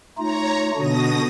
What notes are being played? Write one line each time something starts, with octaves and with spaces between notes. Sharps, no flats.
A3 D#4 F4 C#5 A#5
B2 D3 D4 F#4 D#6 A#6